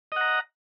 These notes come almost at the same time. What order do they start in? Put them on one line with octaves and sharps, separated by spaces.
D#5 F#5 A#5